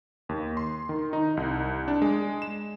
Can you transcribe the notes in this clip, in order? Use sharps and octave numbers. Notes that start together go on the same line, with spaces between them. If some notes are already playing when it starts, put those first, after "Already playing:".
D#2
C6
D#3
D#4
C2
D4
G#3
E7